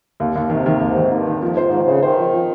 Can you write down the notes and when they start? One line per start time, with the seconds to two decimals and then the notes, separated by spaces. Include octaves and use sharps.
0.20 D#2
0.36 D#2
0.50 C3 D#3
0.66 D#3
0.80 D#2 G#2
0.97 D#3
1.12 G2 A#3
1.27 D#3
1.41 F2 F3
1.57 C5
1.62 G#2
1.72 D#3 F4
1.82 C#3
1.88 C5
2.02 D#3 C5
2.18 F3
2.34 F3